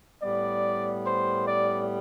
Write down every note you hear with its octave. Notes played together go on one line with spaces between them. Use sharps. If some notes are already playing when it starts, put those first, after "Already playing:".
A2 G3 B3 D5
C5
D5